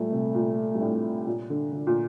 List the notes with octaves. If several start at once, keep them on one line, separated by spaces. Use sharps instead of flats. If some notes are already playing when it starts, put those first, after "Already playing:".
Already playing: A#2 G3 A3
C3
A#2
G2
A2
A#2
D3
D3
A#2